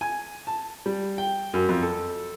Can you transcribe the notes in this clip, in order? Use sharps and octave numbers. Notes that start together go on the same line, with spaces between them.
G#5
A5
G3
G5
F#2
F2
A4